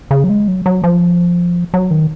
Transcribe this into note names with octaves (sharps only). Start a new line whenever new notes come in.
C#3
F#3
G#3
F#3
F#3
F3
F#3
D#3